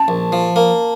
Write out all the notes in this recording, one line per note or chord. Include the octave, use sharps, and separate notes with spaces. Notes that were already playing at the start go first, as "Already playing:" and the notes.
Already playing: A5
A#1
F3
A#3